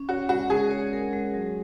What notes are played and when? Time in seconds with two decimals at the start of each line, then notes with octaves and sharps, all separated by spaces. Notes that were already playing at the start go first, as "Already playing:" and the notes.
Already playing: C#4
0.09 F#4 C#5
0.29 G#3 F#4
0.50 G#3 G#4
0.71 C#5
0.93 A#4
1.13 G#3
1.34 F#3